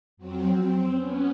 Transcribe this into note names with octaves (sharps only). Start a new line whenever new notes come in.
F2 F#3 C4
C4
B3 C#4